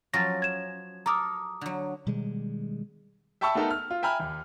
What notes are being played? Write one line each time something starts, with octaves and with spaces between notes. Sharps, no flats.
F3 F#3 C#4 A6 A#6
G#6 E7
A4 A#4 A#5 D6 D#6
D3 F#3
B2 D#3 G3 G#3
E5 G5 A5 B5 C#6 E6
A3 B3 D#4 A4 A#4 E5
F6
F4
E5 G5 G#5 A#5 B5 F6
D#2